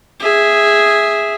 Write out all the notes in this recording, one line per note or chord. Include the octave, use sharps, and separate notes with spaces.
G#4 E5